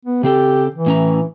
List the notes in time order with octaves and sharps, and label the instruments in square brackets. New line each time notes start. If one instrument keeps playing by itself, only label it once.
[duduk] B3
[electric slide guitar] C#3 C4 A4 [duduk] G4
[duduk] E3
[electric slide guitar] A2 C#4 A#5